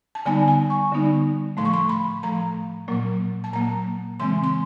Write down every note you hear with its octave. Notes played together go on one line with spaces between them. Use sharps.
A5
D3 G3 B3 D#4 G#5
G#5
C#6
D3 G3 B3 D#4
A2 F3 A3 C6
C#6
C6
B5
A2 F3 A3 A#5
A#2 F#3 A#3
A5
A#2 F#3 A#3 A#5
C#3 E3 G#3 C4 C6
C6